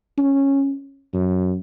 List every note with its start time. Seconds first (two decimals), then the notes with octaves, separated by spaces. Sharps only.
0.18 C#4
1.14 F#2